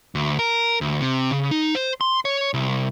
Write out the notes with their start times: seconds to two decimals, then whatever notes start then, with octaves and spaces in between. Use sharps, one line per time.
0.15 D2
0.39 A#4
0.81 D2
1.01 C3
1.31 C#3
1.51 D#4
1.75 C5
2.01 C6
2.25 C#5
2.54 C2